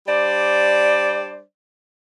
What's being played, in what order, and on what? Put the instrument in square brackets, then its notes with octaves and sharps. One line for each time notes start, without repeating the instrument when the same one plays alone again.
[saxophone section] G3 D4 C5 D5